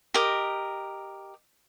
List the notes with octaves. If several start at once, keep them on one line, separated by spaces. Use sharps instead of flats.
G4 A#4 D#5